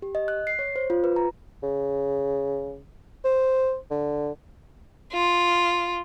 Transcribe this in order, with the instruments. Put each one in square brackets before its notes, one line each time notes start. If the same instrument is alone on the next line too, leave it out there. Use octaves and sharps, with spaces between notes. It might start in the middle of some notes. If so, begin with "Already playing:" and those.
[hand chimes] G4
D#5
F#6
C7
C#5
C5
F4
B4
A#5
[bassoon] C#3
C5
D3
[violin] F4